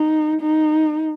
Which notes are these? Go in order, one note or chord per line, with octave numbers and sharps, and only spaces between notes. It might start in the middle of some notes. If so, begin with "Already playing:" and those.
Already playing: D#4
D#4